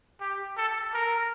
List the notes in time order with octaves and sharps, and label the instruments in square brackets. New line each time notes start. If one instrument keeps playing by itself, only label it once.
[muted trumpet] G4
A4
A#4